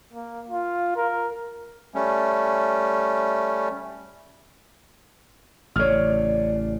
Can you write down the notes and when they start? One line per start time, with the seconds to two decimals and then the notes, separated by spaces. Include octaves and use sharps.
0.13 A#3
0.50 F4
0.96 A#4
1.94 G3 A3 C#4
5.76 A1 C#3 C#5 D5 F6